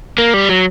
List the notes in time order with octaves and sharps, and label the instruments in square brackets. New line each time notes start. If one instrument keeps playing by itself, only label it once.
[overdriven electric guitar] A#3
G3
F#3